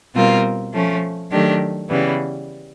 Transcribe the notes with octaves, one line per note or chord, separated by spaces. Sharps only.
B2 G3 C4 F4 A#4
F3 A3 C#4
D#3 F#3 A3 D4 G4
C#3 E3 G3 B3